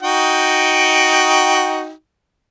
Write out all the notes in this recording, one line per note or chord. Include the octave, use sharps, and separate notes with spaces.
D#4 F#4 G5